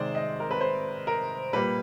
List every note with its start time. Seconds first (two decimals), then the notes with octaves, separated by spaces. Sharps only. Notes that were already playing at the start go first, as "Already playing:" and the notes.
Already playing: C3 D#3 G#3 C5 D5
0.15 D#5
0.40 A#4
0.51 B4
0.61 C5
1.07 A#4
1.53 A#2 G3 A#3 B4